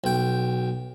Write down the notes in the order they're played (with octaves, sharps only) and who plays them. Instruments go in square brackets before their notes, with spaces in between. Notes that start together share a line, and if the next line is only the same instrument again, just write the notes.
[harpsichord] B1 G5